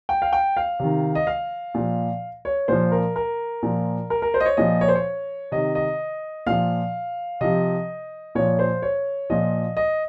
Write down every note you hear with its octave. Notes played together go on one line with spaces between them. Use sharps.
G5
F5
G5
F5
C3 D#3
D#5
F5
A#2 F3
C#5
A#2 F3 C5
A#4
A#4
A#2 F3
A#4
A#4
C5
D#5
C#5
A#2 F3 D#5
C#5
C5
C#5
C3 D#3 D#5
D#5
A#2 F3 F5
C3 F3 D#5
A#2 F3 C#5
C5
C#5
A#2 F3 D#5
D#5